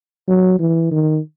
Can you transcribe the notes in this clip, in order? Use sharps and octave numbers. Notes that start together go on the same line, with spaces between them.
F#3
E3
D#3